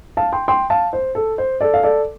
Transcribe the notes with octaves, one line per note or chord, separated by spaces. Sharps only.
F5 A5
G5 C6
G5 C6
F5 A5
C5
A4
C5
A4 D5
F5
A4 D5